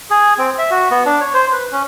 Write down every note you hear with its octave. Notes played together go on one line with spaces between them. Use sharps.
G#4
C4
E5
F#4
B3
D4
C#5
C5
B4
C#4